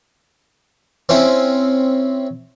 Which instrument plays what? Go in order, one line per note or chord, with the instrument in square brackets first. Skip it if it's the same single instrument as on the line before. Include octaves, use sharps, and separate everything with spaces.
[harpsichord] C4 C#4 E4